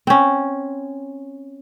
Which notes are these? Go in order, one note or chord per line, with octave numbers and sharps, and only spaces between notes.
C4 C#4